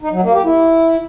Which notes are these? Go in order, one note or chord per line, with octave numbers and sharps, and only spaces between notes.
D#4
F#3
A#3
G4
E4